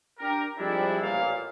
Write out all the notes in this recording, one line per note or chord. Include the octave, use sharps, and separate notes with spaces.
D4 G4 A#4
F3 G3 G#3 C4 D4 E4
A1 A#2 F5